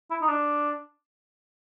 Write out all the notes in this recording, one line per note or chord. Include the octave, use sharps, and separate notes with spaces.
E4
D#4
D4